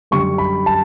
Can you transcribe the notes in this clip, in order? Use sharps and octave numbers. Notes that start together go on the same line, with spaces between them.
F#2 D3 G3 C#6
B5
A5